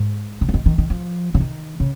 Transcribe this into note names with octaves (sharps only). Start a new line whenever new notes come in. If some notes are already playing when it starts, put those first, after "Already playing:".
Already playing: G#2
C#3
F3
D#3
D#3
D#3
F3
C#3
D#3
C#3